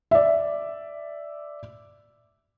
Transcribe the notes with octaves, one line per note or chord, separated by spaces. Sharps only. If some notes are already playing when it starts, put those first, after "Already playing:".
D5 E5